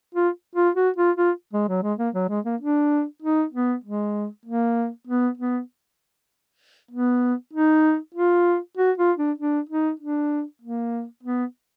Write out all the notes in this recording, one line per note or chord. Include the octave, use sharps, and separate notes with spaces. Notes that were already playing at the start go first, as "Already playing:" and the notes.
F4
F4
F#4
F4
F4
G#3
F#3
G#3
A#3
F#3
G#3
A#3
D4
D#4
B3
G#3
A#3
B3
B3
B3
D#4
F4
F#4
F4
D4
D4
D#4
D4
A#3
B3